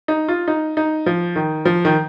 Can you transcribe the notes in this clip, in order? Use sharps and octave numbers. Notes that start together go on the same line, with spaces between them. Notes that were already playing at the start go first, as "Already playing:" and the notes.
D#4
F4
D#4
D#4
F3
D#3
F3
D#3